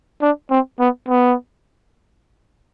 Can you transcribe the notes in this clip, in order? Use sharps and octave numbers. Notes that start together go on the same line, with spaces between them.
D4
C4
B3
B3